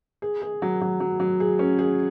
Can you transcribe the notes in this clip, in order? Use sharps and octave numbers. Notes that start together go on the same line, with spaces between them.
G#4
G#4
F#3
F#3
F#3
F#3
G#4
C#4
G#4